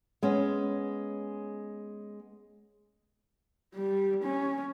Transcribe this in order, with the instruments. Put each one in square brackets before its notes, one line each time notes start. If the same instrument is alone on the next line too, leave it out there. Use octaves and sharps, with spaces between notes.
[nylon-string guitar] G#3 B3 C#4
[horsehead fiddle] G3
C#4